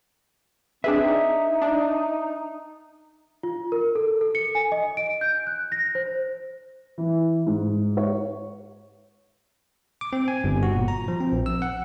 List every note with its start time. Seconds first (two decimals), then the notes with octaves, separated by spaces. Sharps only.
0.84 C4 D4 G#4 B4 E5
1.04 D#4
1.62 D4
3.43 F4
3.72 A#4
3.95 A4
4.21 A4
4.35 C#7
4.55 G#5
4.72 D#5
4.97 D7
5.21 G6
5.47 F#6
5.72 A#6
5.95 C5
6.98 E3
7.47 G#2
7.97 C#5
10.01 D6
10.13 C4
10.28 G#5
10.44 G1
10.63 F#4
10.75 A#2
10.88 A#5
11.08 F3
11.20 C4
11.32 A#1
11.46 E6
11.62 F#5